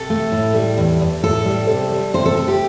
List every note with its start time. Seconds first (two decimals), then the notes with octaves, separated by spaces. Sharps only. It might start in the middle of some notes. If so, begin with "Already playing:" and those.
Already playing: C3 A4
0.10 A3
0.32 A2
0.55 G3
0.78 E2
1.01 E2
1.23 A2 A4
1.45 G3
1.68 C3
1.91 G3
2.14 C3 C5
2.25 A4
2.36 A3 A4
2.48 G4